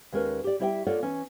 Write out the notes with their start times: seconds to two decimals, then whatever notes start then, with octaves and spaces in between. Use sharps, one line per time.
0.13 D#2 G#3 C#4 A#4 B4
0.44 G4 D5
0.59 G3 E4 G4 D5 E5 G5
0.87 A#3 F4 A4 C#5 D5 F#5
1.03 E3 C#4